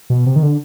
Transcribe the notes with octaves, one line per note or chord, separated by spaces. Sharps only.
B2
C3
D#3
D3